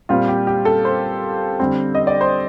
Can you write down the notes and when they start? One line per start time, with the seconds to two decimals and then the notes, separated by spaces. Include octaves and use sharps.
0.09 A#2 G3 C4 F4
0.28 G4
0.47 G4
0.65 A4
0.85 C5
1.60 D3 G3 C4
1.95 D#5
2.07 D5
2.21 C5